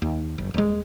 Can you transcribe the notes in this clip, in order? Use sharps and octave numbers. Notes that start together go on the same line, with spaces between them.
D#2
F#1
D#1 G#3